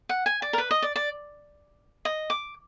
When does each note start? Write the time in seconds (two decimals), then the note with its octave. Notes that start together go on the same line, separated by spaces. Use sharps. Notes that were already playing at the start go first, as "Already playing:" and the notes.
0.09 F#5
0.26 G#5
0.42 D5
0.53 A#4
0.58 B4
0.71 D#5
0.82 D5
0.96 D5
2.05 D#5
2.30 D6